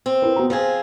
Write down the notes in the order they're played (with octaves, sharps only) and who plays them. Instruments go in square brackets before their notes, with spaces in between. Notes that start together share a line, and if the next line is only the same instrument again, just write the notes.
[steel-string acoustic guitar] C4
[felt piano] E4 A#4 B4
B3 F#4 A#5
[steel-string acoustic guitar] F3 C4 G#4 [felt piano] C5